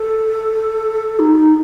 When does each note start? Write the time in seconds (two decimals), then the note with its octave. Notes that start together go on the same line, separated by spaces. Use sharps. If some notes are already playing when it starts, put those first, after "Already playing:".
Already playing: A4
1.19 D#4